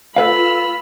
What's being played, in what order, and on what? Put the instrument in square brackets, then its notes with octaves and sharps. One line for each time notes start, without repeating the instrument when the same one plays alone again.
[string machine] F4 E6 F6 [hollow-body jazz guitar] A4 B4 F5 [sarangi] B5